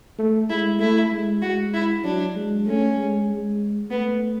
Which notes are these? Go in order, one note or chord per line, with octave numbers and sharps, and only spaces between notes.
A3
G#3 E4
A3 E4
G#3
G#3 F#4
E4
F#3 D4
G#3
A3 C#4
G#3
G#3
A3 B3